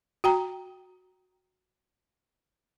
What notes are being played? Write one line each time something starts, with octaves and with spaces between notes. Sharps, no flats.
F#4 G5 A#5